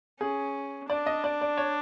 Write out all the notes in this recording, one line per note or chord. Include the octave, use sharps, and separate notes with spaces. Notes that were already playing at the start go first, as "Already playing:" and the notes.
C#4 G#4
D4 D5
D#5
D5
D5
C#5